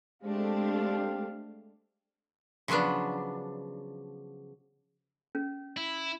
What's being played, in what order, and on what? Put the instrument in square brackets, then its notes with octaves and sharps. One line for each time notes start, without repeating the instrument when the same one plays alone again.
[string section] G#3 A3 D4 [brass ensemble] C4 G4 F5
[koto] C#3 F3 F#3 B3 D4
[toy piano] C#4
[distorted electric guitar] E4